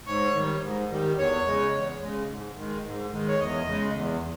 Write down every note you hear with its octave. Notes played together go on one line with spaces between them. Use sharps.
G#2 C#5
D#3 G3
G#2
D#3 G3
E2 C#5
C#3 G#3
E2
C#3 G#3
G#2
D#3 G#3
G#2
D#3 G#3
C#5
E2 D#5
C#3 G#3
E2